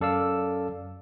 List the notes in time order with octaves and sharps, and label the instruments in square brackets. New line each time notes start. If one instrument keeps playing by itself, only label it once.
[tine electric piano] F#2 A4 D5 F5 E6